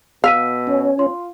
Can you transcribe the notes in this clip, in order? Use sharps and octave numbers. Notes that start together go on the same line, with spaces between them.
B2 F5 E6 B6 D#7
C#4
F4 C6